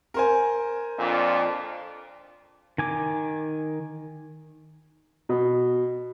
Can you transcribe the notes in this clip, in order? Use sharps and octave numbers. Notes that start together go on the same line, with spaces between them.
A#4 C5 G#5
F2 A#2 D4
D#3 G#5 D6
B2